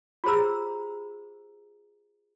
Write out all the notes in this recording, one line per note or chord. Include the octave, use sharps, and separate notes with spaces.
F4 G4 G#4 C5 A#5 E6